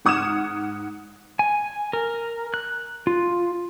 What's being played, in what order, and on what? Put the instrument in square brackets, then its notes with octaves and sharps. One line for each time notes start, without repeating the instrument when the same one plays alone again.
[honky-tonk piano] G#2 F#5 D#6 F6 G#6 E7
[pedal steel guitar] G#5
A#4
F#6
F4